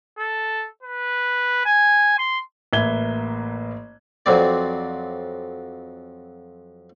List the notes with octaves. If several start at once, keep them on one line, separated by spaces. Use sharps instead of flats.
A4
B4
G#5
C6
A1 A#3 B4 E5 G#6 G7
F2 F#3 C4 D5